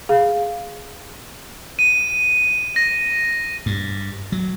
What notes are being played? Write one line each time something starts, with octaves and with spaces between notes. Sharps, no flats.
G#4 F5
D#7
A#6
G2
F#3